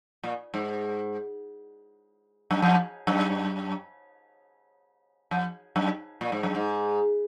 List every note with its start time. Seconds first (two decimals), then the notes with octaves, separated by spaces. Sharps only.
0.24 A#2
0.54 G#2
2.51 F#2
2.62 F2
3.07 F#2
5.31 F2
5.76 F#2
6.21 A#2
6.32 G#2
6.43 F#2
6.55 G#2